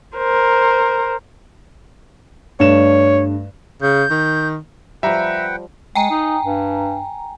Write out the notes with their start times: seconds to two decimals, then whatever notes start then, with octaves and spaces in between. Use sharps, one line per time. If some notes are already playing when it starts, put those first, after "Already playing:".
0.17 A#4 C5
2.60 G2 A3 C#5 E7
3.82 C#3 G6
4.11 D#3
5.03 F3 G3 B4 E5 F#5 G5 A#5
5.95 G#3 G5 G#5 A#5
6.11 D#4
6.45 G2